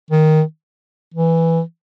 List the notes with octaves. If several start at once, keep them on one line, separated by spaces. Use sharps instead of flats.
D#3
E3